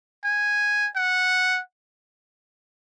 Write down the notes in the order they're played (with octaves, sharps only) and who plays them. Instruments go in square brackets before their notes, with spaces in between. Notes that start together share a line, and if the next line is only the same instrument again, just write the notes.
[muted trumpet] G#5
F#5